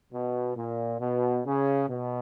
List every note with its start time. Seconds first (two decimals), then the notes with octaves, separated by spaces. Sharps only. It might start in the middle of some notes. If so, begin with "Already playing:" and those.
0.12 B2
0.56 A#2
1.00 B2
1.45 C#3
1.88 B2